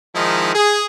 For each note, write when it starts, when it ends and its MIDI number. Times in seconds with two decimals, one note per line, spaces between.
0.15 0.52 51
0.15 0.52 53
0.15 0.52 56
0.15 0.52 63
0.15 0.52 64
0.55 0.84 68